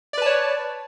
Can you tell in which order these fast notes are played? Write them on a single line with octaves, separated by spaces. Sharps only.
D5 B4 A5 C#5